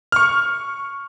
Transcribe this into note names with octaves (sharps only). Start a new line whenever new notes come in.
C#6 F6